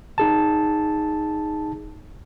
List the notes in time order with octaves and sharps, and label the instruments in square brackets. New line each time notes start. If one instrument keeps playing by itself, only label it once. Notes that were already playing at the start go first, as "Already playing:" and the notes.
[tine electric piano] D#4 G#4 A5